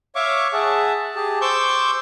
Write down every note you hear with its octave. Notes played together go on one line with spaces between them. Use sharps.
C#5 E5 F5 C#6 D6
G#4 E5 F#5 A5
G4 G#4 A5
C5 C#6 D6 E6 G6